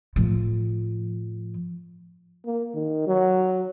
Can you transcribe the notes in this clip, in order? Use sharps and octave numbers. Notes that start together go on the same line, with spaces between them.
A2 F3
A#3
D#3
F#3